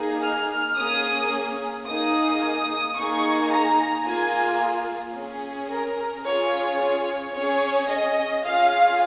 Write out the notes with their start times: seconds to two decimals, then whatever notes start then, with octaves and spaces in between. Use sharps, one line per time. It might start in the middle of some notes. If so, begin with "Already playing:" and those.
Already playing: A#3 D#4 G#4
0.23 F6
0.77 A#3 C#4 G#4 D#6
1.86 A#3 D#4 G#4 D#6
2.42 D#6
2.96 A#3 D#4 G#4 C#6
3.51 A#5
4.05 A#3 F4 G#4 G#5
5.15 C#4 G#4
5.71 A#4
6.25 C#4 F4 G#4 C#5
6.80 C#5
7.34 C#4 G#4 C#5
7.89 D#5
8.44 C#4 F4 G#4 F5